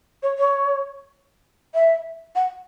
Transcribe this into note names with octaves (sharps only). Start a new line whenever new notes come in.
C#5
C#5
E5
F#5